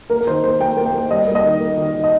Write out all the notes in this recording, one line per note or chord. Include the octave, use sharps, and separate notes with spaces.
A#3 A#4
A#4
D#3 C5
A#3 C5
A#3 G5
A#3
G5
A#3 C5
G3 D#5
A#3
D#5
D#3
A#3
D#3
D#3
D#5